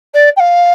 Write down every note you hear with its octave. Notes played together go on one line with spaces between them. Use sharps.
D5
G5
F5